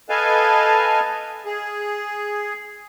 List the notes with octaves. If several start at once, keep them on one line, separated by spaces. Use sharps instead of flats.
A4 B4 D#5 F5 G#5 A5
G#4